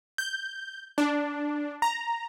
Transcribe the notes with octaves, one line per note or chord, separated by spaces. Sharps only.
G6
D4
A#5